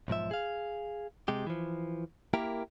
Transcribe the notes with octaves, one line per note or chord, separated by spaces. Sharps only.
B1 G#2 F3 E5
G#4 F5
C3 G#3 G4
E3 F3
A#3 E4 G4 A#4